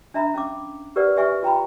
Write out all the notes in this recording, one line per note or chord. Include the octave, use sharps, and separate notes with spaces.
D4 E5 A#5 B5
C#4 F5 D6
G4 A#4 B4 D5 F#5
G4 B4 E5 F5 G#5 C#6
F4 G5 A#5 B5